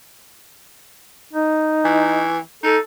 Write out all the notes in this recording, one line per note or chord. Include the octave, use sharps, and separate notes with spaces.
D#4
E3
D#4 A4